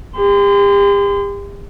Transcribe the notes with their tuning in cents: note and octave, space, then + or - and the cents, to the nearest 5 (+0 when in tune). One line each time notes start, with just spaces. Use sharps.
G4 +40 C6 -35